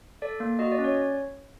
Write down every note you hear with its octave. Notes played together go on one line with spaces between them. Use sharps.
A4 D5
A#3
F#4 D#5
D5
C#4
C#5